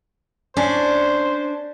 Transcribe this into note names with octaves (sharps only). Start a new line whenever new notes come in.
C#4 D4 C5